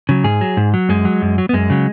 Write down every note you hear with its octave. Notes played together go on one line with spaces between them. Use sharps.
C#3 F#3
G#2 G#4
F#3
G#2
F#3
F#2 G#3
F#3
F#2
F#3
B3
F#2 G#3
C#3 F#3